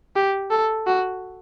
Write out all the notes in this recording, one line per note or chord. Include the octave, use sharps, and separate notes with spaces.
G4
A4
F#4